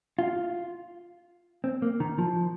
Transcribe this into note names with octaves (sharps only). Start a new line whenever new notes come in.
F4
C4
A#3
D#3
F3